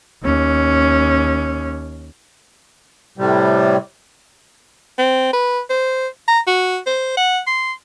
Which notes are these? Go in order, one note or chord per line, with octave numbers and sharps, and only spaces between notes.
D#2 C#4
A2 C3 G3
C4
B4
C5
A#5
F#4
C5
F#5
C6